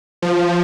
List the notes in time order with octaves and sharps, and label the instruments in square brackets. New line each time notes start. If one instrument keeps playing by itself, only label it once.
[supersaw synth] F3